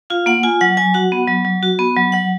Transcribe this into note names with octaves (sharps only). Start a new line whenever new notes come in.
F4 F5
A#3 F#5
F4 G#5
F#3 F#5
F#3 G#5
F#4 F#5
B3
F#3
F#3
F#4
B3
F#3
F#3 F#5